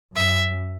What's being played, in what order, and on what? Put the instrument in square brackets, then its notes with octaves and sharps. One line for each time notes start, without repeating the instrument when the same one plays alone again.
[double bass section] F#2 [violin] E5